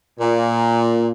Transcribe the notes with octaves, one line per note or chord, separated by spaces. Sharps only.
A#2